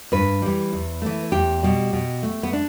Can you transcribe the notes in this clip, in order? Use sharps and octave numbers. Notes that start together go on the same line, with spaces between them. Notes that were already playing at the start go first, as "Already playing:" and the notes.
G2 B4
E3 G3
E2
E3 A3
E2 G4
B2 G3
B2
A3
B3
D4